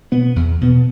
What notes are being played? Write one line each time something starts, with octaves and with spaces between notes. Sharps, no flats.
B2 B3
E2
B2 B3